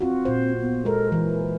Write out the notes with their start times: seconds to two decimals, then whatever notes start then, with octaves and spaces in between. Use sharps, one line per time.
0.01 C4 F4 F#4
0.25 A#2 C5
0.61 B3
0.85 G#3 A4 A#4
1.12 E3 A#4